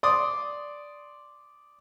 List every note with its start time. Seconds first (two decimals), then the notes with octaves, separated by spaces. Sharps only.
0.03 D5 C6 D6 D#6